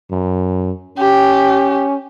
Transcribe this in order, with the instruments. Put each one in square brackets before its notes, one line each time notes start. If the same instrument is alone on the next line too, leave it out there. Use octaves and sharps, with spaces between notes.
[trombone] F#2
[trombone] C#4 [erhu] G4